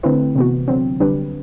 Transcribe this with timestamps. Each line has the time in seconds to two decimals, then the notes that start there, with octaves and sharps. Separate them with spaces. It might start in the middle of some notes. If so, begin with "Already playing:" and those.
0.03 D3 A3 C4 E4 B4
0.35 C3 E3 B3 F#4
0.68 D3 F#3 C4
1.00 D3 G3 D4 G4 B4